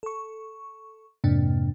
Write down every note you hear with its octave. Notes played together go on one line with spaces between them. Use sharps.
A4 C#6
F2 G#2 C3 A#3 D4